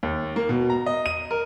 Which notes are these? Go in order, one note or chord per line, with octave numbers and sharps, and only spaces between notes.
D#2
A#3
B2
A#5
D#5
D#7
A#4